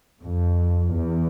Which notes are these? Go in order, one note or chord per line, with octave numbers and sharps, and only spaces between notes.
F2
E2